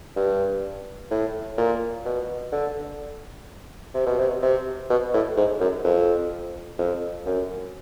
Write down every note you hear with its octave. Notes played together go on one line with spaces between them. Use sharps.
G2
A2
A#2
B2
D3
C3
B2
C3
C3
B2
A2
G#2
F#2
F2
F2
F#2